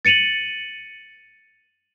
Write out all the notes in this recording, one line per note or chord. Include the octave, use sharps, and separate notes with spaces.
A6 C#7 D#7 F7 F#7